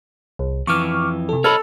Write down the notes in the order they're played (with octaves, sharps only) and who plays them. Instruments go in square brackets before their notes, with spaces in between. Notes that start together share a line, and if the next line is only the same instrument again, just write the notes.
[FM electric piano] C2
[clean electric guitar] F2 E3 [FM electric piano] C#6 D6 F6
[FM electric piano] C3 A4
[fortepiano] A4 [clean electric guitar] C#5 D#5 B5 [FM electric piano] F6